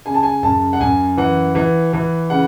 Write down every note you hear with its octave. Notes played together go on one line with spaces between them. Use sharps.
C#3 G#5
A5
G#5
F#2 A5
F#5
F#2 G#5
E3 F#5
E3
E3
C#3 F#5